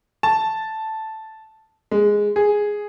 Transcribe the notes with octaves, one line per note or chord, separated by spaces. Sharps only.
A5
G#3
G#4